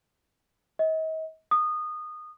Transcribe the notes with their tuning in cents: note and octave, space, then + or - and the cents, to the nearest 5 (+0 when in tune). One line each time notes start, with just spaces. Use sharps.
D#5 +40
D#6 -20